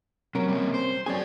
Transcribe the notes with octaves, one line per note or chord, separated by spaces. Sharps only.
C3 F#3 C#4 A#4
G3 A#3
C5
F#2 C#4 G#4 D5 G#5